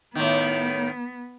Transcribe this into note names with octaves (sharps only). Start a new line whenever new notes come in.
A2 D#3 B3